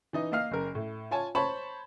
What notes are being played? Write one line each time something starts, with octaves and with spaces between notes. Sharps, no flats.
E3 D#4 D#5
A#3 D#5 F5 F6 C7
F#1 A#4
A2
F4 C#5 G#5 A5
C5 C#5 A5 B5 C#6